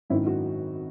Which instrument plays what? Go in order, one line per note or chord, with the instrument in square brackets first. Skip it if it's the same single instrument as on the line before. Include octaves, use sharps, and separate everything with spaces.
[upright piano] G#1 F#2 D#3 E4
F#4